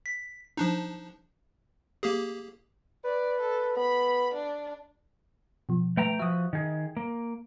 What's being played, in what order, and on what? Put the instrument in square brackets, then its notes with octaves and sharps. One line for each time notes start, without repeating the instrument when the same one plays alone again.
[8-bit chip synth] B6
F3 D4 D#4
A#3 G4 G#4
[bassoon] B4 [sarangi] D5
[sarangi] A4
[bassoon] B3 [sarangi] B5
[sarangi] D4
[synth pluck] B2 F3
[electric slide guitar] A3 G5 A#5 [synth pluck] B4
[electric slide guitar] F3 F#4 [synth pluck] E5 D#6
[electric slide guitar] D#3 G#4
A#3